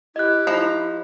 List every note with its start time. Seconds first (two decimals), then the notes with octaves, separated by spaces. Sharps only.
0.16 E4 G4 D#5 F#6
0.47 F3 D#4